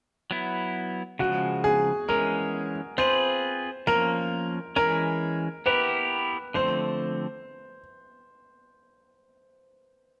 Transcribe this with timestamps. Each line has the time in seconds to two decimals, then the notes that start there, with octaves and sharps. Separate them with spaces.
0.31 F#3 B3 E4
1.19 C#3 F3 G#3 F#4
1.64 G#4
2.09 E3 G#3 C#4 A#4
2.98 C4 F4 G#4 B4 C5
3.87 F3 A#3 C#4 A#4
4.76 E3 G#3 C#4 A#4
5.66 B3 E4 G4 A#4 B4
6.54 D3 F3 A3 C4 C5